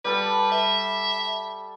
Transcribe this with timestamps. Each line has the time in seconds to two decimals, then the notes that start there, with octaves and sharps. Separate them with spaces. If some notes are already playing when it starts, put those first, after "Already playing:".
0.05 G3 A4 B4 A5
0.52 E5